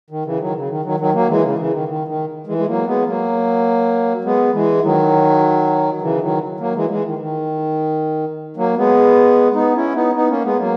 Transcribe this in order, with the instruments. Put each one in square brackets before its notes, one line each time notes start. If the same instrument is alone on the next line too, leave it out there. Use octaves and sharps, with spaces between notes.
[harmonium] D#3
C#3 E3
D#3 F#3
C#3
D#3
D#3 F#3
D#3 F#3
F#3 A#3
E3 G#3
C#3
C#3 E3
D#3
D#3
D#3
E3 G#3
G#3
F#3 A#3
G#3 B3
F#3 A#3
G#3 B3
E3 G#3
D#3 F#3
C#3 E3
D#3 F#3
F#3 A#3
E3 G#3
E3 G#3
D#3
D#3
F#3 A#3
G#3 B3
B3 D#4
C#4 E4
B3 D#4
B3 D#4
A#3 C#4
G#3 B3
F#3 A#3